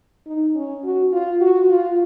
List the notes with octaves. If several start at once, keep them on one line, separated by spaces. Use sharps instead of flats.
D#4
C#4
F#4
F4
F#4
F4